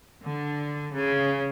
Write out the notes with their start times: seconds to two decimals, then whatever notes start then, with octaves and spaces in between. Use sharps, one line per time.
0.25 D3
0.93 C#3